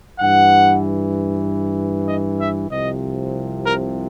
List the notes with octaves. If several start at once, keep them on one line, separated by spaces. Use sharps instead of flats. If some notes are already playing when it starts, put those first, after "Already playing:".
G2 E3 F#5
D#5
E5
C2 C3 F3 D#5
A#4